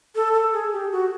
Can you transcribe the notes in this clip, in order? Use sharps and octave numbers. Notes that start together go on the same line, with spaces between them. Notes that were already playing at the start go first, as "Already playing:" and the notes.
A4
A4
G#4
G4
F#4